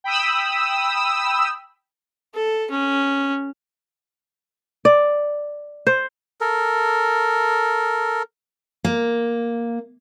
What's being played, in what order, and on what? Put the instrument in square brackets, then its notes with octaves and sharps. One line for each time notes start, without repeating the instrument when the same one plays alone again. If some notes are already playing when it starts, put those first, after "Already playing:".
[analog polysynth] G5 B5 D#6 E6
[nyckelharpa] A4
C#4
[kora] D5
C5
[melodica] A4 A#4
[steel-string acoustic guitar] A#3